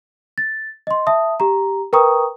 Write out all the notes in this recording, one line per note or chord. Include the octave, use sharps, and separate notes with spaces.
A6
D#5 C6
E5 A5 D#6
G4 A#5
A#4 B4 G5 A#5 C#6 D#6